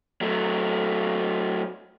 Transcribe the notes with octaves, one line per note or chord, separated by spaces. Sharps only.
F#3 A3